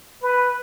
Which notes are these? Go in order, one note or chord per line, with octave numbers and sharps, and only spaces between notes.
B4